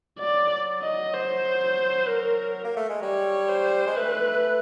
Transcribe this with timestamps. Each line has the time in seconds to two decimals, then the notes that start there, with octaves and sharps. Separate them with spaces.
0.19 F#3 D5
0.82 D#5
1.14 C5
2.08 A#4
2.64 A#3
2.76 A3
2.89 G#3
3.02 G3 C#5
3.49 C5
3.87 G#3
3.97 A3 B4